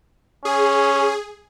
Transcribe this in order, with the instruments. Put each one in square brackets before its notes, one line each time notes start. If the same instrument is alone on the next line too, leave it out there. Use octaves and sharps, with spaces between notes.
[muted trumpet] C#4 [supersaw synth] G#4